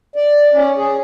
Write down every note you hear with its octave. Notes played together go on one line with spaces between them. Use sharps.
D5
C#4
G#4